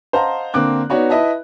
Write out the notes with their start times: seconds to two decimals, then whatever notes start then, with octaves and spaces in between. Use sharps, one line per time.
0.13 C5 D#5 F5 F#5 A5 A#5
0.54 D3 A#3 C4 D6 F#6
0.90 B3 D#4 F#4 C#5 D5
1.10 E4 B4 D#5 E5 A5